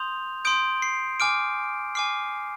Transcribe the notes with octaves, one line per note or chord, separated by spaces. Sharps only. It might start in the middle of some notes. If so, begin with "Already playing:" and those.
Already playing: C6 D#6 G6 F7
C6 D#6 G6 D7
C7
G#5 D6 F6 D7
G#5 D6 F6 C7